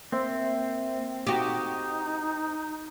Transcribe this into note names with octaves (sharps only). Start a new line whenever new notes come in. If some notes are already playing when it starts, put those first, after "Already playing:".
A#3 C4 C5 E5
D#4 F#4 G4 D#6